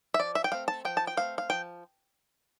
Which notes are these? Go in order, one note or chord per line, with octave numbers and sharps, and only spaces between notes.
E5
F3 D5
E5
G5
A3 C4 F5
A5
F3 G5
A5
G5
A3 C4 F5
F5
F3 G5